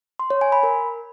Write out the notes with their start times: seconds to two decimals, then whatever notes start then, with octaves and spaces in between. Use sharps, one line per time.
0.19 C6
0.30 C#5
0.41 G#5
0.52 B5
0.63 A#4